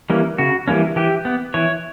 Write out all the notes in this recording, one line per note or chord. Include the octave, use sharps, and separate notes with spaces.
E3 G3 A#3 C#4
C#3 F#4
E3 G3 A#3 C#4
E3 G4
B3
E3 C#5